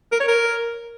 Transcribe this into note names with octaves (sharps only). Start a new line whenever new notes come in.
A#4
C#5
A#4